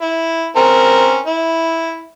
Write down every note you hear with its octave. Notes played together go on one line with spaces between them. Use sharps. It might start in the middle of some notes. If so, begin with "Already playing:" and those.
E4
C4 C#4 A#4
E4